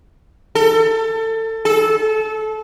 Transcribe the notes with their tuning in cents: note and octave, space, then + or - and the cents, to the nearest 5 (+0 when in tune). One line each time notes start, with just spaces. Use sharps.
A4 +25
A4 -25